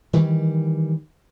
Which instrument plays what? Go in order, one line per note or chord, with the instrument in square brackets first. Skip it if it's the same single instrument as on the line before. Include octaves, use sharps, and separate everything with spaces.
[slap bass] D#3 E3 G3